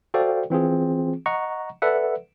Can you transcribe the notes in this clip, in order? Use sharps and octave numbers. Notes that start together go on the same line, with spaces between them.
F#4 A4 C5 D5 F5 G5
E3 C4 F4 G#4
D#5 F#5 A#5 C#6
A4 B4 D5 E5 F#5